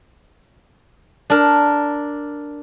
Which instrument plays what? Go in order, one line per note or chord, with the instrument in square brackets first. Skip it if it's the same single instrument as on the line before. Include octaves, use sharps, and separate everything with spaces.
[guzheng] D4 A#4